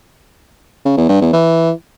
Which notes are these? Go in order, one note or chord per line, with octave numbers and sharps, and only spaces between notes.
C#3
E2
G2
E2
E3